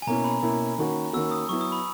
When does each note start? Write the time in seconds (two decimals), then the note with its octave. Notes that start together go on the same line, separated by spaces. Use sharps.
0.02 G#5
0.07 B2 A#3 C#4 E4 A#5
0.24 B5
0.42 B2 A#3 C#4 E4
0.78 D#3 A#3 C#4 F#4
1.13 D#3 A#3 C#4 F#4 E6
1.31 D#6
1.49 F#3 B3 E4 C#6
1.61 D#6
1.72 B5